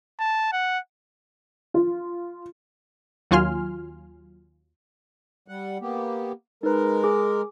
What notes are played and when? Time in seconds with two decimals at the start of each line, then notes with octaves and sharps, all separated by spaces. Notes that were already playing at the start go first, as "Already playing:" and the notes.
0.20 A5
0.53 F#5
1.74 F4
3.31 D#2 F#3 F4 G#5 C6 F6
5.48 G3 F#5
5.81 A#3 B3 G4
6.63 G#3 D#4 A#4 B4
7.04 G#4 D6